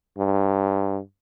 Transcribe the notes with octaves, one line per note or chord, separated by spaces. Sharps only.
G2